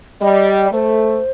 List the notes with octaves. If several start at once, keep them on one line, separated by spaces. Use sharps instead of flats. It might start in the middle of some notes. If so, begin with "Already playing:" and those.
G3 D#5
A3 C5